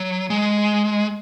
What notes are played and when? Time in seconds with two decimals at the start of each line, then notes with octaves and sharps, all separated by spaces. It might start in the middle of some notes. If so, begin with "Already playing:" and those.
Already playing: F#3
0.30 G#3